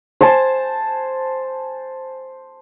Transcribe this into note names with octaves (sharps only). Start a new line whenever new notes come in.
C5 G#5 A5